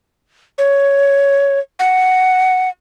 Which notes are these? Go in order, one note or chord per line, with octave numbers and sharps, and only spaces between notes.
C#5
F#5